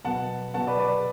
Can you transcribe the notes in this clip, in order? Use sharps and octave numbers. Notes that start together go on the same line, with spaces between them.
B2 F#3 B3 F#5 A5
B2 F#3 B3 F#5 A5
B4 D5
B4 D5